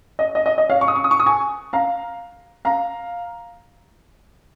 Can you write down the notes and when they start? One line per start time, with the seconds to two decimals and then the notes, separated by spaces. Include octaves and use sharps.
0.19 D#5
0.35 D#5
0.46 D#5
0.58 D#5
0.69 C#5 F5
0.81 C#6
0.88 D#6
0.96 C#6
1.04 D#6
1.11 C#6
1.20 D#6
1.26 G#5 C#6
1.73 F5 A#5
2.65 F5 A#5